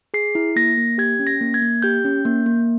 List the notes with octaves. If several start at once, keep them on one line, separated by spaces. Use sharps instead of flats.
G#4 C7
E4
A#3 A#6
A#3
G4 G#6
C#4
A#6
A#3
G#6
A#3
G4 G6
C#4
A#3
A#3